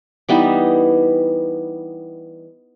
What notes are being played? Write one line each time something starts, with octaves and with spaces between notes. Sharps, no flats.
E3 G3 B3 D#4